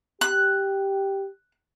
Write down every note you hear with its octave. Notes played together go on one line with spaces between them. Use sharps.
G4 F#6